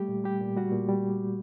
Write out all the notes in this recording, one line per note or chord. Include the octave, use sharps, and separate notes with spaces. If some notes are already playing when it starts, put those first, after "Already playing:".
Already playing: G3 A3 G4
A#2
G3 G4
A#2
G3 F#4
A#2
G3